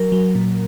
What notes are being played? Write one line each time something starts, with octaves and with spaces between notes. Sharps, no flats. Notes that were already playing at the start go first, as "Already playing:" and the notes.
Already playing: F#3 A#4
F#3
A#2